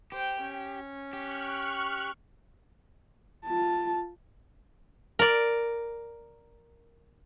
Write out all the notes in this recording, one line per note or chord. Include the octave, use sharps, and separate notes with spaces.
G4 C5 G5
C#4
G4 C#6 F6 F#6
F4 A5
A#4 D5